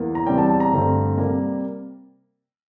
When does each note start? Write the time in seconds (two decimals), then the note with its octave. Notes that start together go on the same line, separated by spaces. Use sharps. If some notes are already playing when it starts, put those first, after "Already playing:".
Already playing: E2 E3 A#3
0.15 A#5
0.26 E2 C3 G3 G5
0.38 A5
0.50 A5
0.60 A#5
0.72 G2 D3 A3 C4
1.18 C3 G3 A#3